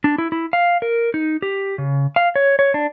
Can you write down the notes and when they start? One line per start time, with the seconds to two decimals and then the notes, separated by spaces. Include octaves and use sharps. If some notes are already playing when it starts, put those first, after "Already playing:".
0.04 D4
0.18 E4
0.32 E4
0.53 F5
0.82 A#4
1.14 D#4
1.42 G4
1.78 C#3
2.16 F5
2.36 C#5
2.59 C#5
2.74 D4